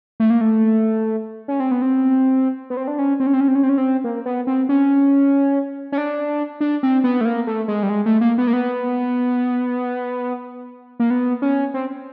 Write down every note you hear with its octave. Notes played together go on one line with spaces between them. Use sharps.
A3
A#3
A3
C#4
C4
B3
C4
B3
C4
D4
C#4
C4
C#4
C4
C#4
C4
C#4
C4
C#4
C4
A#3
B3
C4
C#4
C#4
D4
D4
C4
B3
A3
A#3
A3
G#3
G3
G#3
A3
A#3
B3
A#3
B3
A#3
B3
C#4
C4